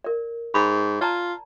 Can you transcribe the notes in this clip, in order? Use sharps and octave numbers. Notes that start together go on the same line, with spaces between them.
A#4 D5
G#2 B5
F4 D5 A5 A#5